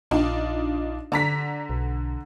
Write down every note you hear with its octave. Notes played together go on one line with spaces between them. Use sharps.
A#1 D4 D#4 F4
D3 D5 A#5 B6
B1